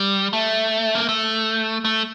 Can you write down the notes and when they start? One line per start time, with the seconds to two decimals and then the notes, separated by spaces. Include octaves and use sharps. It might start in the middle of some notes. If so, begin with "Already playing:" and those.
Already playing: G3
0.33 A3
0.95 A#3
1.09 A3
1.85 A3